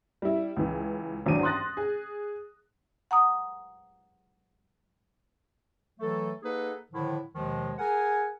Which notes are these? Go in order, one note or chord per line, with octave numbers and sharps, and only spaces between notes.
G3 E4
C#2 E3
G#1 E2 F#3 D4 D#7
C6 D#6 F#6 A6 A#6
G#4
F#5 A#5 D#6
E3 F#3 A3 A4
A#3 D#4 G#4 A4 B4 F#5
A2 D3 D#3 F3 E4
D#2 B2 D#3 F3 G#3
G#4 A#4 F#5 G#5